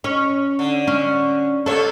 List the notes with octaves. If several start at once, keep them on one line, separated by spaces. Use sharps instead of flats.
C#4 C#5
D3
C#4
C3 A#3 A4 C#5